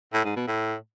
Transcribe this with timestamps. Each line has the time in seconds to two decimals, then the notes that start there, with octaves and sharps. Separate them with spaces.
0.13 A2
0.25 G#2
0.36 B2
0.47 A2